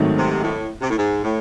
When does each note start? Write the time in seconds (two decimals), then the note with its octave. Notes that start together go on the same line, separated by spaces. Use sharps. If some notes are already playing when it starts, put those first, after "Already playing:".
Already playing: G#1 G#2 D#3 F#3 A3
0.17 C3
0.44 A2
0.82 C3
0.90 A2
0.98 G#2
1.24 A2